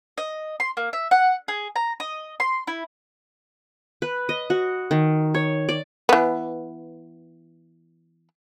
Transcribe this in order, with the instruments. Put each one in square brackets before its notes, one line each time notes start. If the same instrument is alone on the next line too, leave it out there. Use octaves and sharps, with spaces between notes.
[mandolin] D#5
C6
A#3
E5
F#5
G#4
A#5
D#5
C6
E4
[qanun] B4
D#5
F#4
D#3
C#5
D5
[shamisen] E3 B3